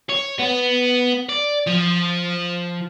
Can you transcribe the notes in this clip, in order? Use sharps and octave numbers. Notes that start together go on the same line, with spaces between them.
C#5
B3
D5
F3